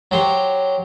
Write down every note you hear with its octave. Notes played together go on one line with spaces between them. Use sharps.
F#3 G4 C5 C#5